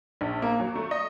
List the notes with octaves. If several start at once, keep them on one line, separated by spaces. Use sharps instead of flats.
A#1
A#3
F#3
A3
D#5